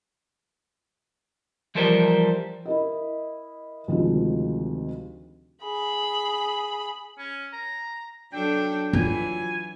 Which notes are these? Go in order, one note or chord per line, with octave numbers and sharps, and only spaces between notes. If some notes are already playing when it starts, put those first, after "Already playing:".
E3 F3 G3 A4 A#4 C5
E4 A#4 D#5
D2 C3 D#3 F3 G#3 C4
G#4 B5
C#4
A#5
F#3 D4 A4 G5
E3 F#3 F4 G#5